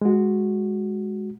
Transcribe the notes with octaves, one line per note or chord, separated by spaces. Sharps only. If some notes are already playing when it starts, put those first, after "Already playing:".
G#3 F#4